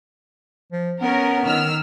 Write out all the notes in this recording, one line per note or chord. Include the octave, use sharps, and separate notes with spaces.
F3
B3 C#4 A#4
D#3 E6 F6